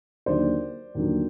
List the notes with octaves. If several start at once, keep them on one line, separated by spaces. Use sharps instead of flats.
D#2 D3 F#3 C5 D5
D#2 D3 F#3